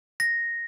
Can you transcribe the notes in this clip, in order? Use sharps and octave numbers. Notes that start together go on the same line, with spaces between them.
A#6